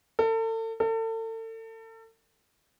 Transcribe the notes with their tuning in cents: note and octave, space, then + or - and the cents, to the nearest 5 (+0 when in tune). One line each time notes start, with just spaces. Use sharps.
A4 +35
A4 +35